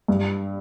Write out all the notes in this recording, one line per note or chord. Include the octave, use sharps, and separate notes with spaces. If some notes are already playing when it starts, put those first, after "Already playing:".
G2